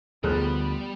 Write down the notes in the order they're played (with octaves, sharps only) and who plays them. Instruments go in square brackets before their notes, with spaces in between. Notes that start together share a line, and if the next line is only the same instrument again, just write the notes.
[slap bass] D2 D3 F3 [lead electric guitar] G3 [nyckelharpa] B3 [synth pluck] G#4 A#4 F#6